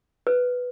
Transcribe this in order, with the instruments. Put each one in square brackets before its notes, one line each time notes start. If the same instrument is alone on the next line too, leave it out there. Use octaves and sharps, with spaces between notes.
[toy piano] B4